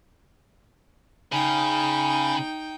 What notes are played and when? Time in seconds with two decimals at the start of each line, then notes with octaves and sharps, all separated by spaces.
1.32 C#3 D#4 G5 G#5 B5